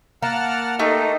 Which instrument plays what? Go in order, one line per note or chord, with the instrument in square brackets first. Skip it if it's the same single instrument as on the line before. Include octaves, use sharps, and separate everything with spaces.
[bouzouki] A#3 [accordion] F#5 A5 F6
[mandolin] A3 [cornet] D#4 [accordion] G4 A4